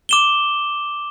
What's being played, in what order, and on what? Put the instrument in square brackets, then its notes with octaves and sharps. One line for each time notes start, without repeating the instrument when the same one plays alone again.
[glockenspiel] D6 E7 G7